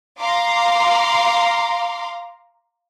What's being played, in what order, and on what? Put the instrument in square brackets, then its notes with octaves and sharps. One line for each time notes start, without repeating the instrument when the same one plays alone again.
[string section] F5 A#5 C6 D6